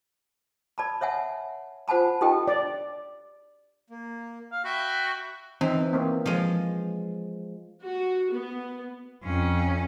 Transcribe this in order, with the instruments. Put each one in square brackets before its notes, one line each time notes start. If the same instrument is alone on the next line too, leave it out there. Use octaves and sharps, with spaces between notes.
[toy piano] D5 A5 B5
C#5 E5 F#5 G#5
F4 C5 F#5 G#5 A5 B5
D#4 F4 G4 A4 D#5 G5
[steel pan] D5
[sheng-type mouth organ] A#3
[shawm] F5
[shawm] F#4 [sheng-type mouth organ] E5 G5 B5
[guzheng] E3 [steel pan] C4 D#4
[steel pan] A#3 C4
[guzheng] F3 G#3
[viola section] F#4
B3
[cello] F2 C#4